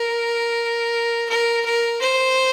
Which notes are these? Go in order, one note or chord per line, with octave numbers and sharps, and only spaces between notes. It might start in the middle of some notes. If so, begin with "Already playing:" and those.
Already playing: A#4
A#4
A#4
C5